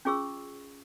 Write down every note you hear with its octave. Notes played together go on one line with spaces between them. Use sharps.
C#4 F4 G#4 C#6 E6